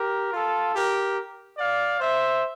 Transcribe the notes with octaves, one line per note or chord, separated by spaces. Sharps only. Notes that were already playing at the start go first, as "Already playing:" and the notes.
Already playing: G4 A#4
F4 A4
G4 A#4
D5 F5
C5 E5